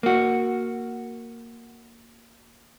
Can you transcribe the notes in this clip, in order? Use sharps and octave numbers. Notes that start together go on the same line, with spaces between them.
A#3 F#4